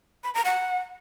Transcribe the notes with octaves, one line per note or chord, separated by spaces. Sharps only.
B5
A#5
F#5